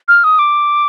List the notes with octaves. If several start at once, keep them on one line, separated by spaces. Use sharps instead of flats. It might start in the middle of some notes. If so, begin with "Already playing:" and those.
F6
D#6
D6